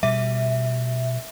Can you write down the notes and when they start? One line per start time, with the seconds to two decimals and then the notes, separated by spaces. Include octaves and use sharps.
0.03 B2 G3 E5